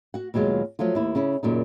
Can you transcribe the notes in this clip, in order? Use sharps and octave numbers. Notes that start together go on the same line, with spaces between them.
F#4 F#5
D#2 B2 F#3 G#3 F4
F3 F#3 A3 F4
D#2 E4
C#3 C#4 E4
F#2 A#2 C#3 D#4